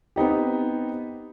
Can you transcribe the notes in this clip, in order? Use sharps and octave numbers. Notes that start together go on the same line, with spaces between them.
B3 C4 D#4 G4